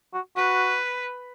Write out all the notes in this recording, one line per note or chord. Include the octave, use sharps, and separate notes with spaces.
F#4
F#4 B4